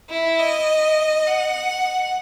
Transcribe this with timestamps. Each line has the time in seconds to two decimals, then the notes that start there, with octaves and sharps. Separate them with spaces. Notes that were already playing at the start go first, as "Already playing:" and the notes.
0.10 E4
0.39 D#5
1.27 F#5